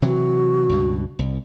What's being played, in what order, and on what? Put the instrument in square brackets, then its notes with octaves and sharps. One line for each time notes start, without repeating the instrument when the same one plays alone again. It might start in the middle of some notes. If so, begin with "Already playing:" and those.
[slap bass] C3 E3 F#3 [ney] F#4
[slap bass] C#2 G2 B2
C2